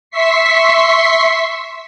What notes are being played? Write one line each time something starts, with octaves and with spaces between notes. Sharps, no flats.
E5 C6 C#6 B6 C7